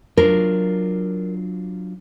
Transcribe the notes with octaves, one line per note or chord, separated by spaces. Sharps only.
F#3 D4 F4 A#4